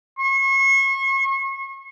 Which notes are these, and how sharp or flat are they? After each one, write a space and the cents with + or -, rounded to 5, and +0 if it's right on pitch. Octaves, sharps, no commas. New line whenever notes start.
C#6 -35